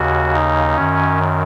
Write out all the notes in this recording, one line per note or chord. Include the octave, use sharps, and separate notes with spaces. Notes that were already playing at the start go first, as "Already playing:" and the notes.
Already playing: D#2 C#3 F#4
D#4
F#2 D#3 C#4